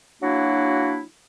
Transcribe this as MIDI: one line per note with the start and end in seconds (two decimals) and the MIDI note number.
0.22 1.02 54
0.22 1.02 58
0.22 1.02 62
0.22 1.02 64
0.22 1.02 66